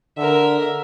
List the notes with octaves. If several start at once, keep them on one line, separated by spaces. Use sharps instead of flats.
D3 A#4 E5